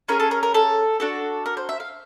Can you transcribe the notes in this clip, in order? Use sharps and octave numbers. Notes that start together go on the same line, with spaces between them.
C#4 E4 G#4 A#4
A4
A#4
A#4
A4
D4 F#4 A4
A#4
C5
E5
F5